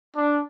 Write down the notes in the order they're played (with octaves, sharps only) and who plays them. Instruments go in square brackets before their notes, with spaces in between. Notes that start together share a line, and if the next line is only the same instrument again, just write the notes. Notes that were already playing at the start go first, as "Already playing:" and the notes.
[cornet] D4